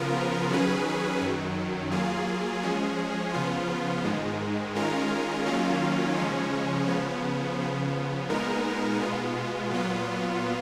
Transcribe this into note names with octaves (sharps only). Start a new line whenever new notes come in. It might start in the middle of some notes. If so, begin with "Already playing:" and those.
Already playing: C#3 F3 B3 F4 A#4
D#3 F#3 C#4 G#4 B4
F#2 D#3 F#3
F#3 A#3 F4 G#4
F3 G#3 C#4 G#4
C#3 F3 B3 F4
G#2 D#3 G#3
D#3 G#3 C#4 F4 A#4
D#3 F#3 A#3 C#4 F4
C#3 F3 G#3 C#4
C#3 F3 B3
C#3 F3 B3
A#2 G#3 B3 D#4 A#4
B2 G#3 B3 F4
A#2 F#3 B3 F4